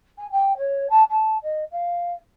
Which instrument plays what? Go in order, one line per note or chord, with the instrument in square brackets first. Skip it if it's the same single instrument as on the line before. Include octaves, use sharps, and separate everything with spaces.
[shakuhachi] G#5
G5
C#5
A5
A5
D#5
F5